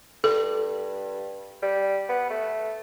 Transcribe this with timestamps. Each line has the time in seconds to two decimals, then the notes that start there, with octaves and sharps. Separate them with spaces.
0.24 G2 A4
1.62 G3
2.09 B3
2.30 A3